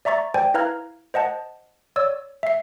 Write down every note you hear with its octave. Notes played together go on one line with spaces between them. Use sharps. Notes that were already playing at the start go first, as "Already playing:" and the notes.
D5 E5 A#5 C#6 A6
C5 D5 G5 G#5
E4 B4 F5 A#5 F6 G#6
C5 D#5 F#5 A5
C#5 D5 E6
E5 C7